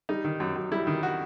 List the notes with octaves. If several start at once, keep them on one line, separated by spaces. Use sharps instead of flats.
G3 D#4
D#3
F#2
F#2
G3 E4
D#3
F#4